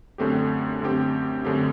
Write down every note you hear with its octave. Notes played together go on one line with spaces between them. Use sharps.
F#2 D3 A3 C4 G4
F#2 D3 A3 C4 G4
F#2 D3 A3 C4 G4